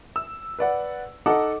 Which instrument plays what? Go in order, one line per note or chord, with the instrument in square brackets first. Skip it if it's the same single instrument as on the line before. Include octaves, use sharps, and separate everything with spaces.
[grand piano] E6
B4 D5 F#5
D#4 A4 D#5 F#5 D6